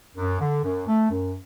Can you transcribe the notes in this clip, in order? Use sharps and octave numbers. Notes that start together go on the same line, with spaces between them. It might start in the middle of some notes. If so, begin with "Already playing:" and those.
F#2
D3
F#2
A3
F#2